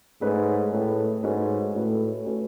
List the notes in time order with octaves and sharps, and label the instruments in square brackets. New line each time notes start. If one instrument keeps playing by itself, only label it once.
[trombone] G#2 [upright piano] A3 C#4 G#4 B4
[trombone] A2 [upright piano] A3 C#4 G#4 B4
[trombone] G#2 [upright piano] A3 C#4 F#4 B4
[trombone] A2 [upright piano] A3 C#4 F#4 B4
[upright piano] A3 C#4 F#4 B4